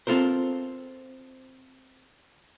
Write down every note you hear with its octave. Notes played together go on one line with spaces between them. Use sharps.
C4 F4 A4 A#4 C5